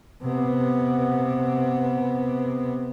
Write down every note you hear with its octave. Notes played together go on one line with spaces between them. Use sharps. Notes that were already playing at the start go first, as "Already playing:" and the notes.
C3 B3